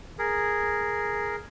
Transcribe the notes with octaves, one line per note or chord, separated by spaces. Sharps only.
G#4 A#4